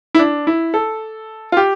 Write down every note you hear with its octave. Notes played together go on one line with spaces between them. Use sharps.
E4
D4
E4
A4
F4
G4